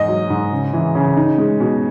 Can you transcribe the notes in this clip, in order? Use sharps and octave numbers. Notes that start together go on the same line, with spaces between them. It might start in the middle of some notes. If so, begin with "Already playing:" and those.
Already playing: E2 G#2 D#5
F#3
G#2
C#3
E3
C#3
D#4
G#3
B2